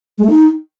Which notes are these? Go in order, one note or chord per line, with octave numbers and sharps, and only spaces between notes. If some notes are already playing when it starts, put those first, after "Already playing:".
G#3
A3
D#4